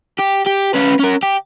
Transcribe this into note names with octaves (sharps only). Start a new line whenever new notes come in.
G4
G4
C#4 B4
C#4 A#4
G4